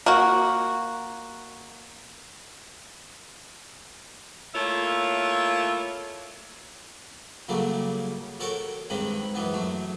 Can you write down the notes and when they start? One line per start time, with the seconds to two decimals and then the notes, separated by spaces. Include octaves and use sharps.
0.06 A#3 F#4
4.54 A3 A#3 E4 F4 C#5
7.48 C#3 F#3 G3 A3 A#3
8.40 F#4 A4 A#4 C#5 G5
8.90 G2 D#3 G#3 C4 B5
9.35 F#2 E3 B3
9.54 F#3 A3